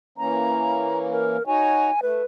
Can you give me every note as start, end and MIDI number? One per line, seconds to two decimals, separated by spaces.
0.18 1.37 52
0.18 1.37 58
0.18 1.37 61
0.18 0.98 82
1.11 1.43 70
1.47 1.91 63
1.47 1.91 66
1.47 1.91 73
1.47 2.00 80
2.02 2.22 57
2.02 2.25 71